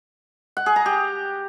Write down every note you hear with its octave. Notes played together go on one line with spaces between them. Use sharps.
F#5
G#4
A#5
G4